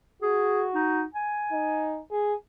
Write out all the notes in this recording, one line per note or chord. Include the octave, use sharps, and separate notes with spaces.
F#4 G#4
D#4
G#5
D#4
G#4